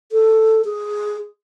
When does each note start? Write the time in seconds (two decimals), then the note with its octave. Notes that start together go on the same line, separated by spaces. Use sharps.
0.12 A4
0.65 G#4